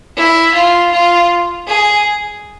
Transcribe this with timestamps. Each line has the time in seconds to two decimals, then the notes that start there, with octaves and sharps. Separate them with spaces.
0.17 E4
0.55 F4
0.92 F4
1.67 G#4